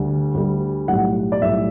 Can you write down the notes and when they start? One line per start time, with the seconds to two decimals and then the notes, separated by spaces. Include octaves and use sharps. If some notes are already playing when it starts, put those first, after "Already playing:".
Already playing: D2 D3 G3
0.34 D2 D3 G3
0.88 B1 A2 G3 F#5
1.32 D5
1.42 B1 A2 G3 E5